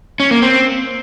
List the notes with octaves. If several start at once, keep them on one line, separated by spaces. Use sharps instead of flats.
C#4
A#3
C4